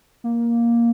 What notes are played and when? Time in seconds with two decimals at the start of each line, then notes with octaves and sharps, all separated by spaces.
0.24 A#3